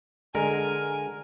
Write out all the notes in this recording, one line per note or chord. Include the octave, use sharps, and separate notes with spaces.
D3 G#3 A#4 G#5